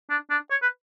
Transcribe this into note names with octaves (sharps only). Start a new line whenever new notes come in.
D4
D4
C#5
B4